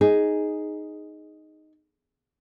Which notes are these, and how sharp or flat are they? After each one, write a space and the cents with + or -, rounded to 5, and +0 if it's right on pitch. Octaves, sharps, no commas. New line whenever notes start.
D#4 +0 G#4 +0